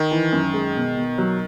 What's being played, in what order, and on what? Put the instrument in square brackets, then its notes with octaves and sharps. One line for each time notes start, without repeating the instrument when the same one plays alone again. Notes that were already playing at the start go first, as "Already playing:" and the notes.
Already playing: [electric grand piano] D#3
[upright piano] E3
F#2
G#3
B2
B2
F#3